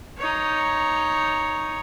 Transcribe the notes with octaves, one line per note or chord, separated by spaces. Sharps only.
D#4 C#5